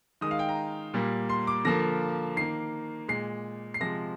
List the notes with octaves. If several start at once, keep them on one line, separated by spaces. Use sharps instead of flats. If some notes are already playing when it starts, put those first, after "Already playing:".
D#3 G#3 D#6
F5
G5
A#5
A#2 G3 A#3
C6
D6
D3 F3 A#3 A#6
D#3 A#3 C7
A#2 G#3 C7
C7
C3 F3 G#3 A#6